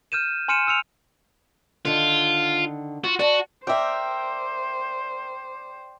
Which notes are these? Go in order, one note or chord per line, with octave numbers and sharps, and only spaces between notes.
F6 G6 D#7 E7
G#5 C6 F6 C#7 D#7 E7
E6 F6 C#7 F7
D3 D#3 F4
F4 F#4
F#4 D5 A5
A#4 C5 D5 E5 G5